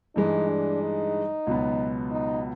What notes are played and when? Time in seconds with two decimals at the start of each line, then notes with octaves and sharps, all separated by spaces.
0.16 G2 E3 G#3 D#4
0.48 D4
0.81 D#4
1.47 C#2 B2 F#3 B3
2.11 D#4